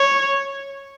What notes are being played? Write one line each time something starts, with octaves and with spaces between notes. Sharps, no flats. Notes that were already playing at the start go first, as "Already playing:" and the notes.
Already playing: C#5